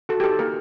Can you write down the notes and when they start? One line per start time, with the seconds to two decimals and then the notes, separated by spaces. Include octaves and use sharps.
0.09 F#4 A4
0.20 G4
0.24 D#4 A4
0.39 A#3 A#4